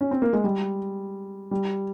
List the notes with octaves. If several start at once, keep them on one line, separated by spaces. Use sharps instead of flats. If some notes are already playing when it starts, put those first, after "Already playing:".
C#4
C4
A#3
G#3
G3
G3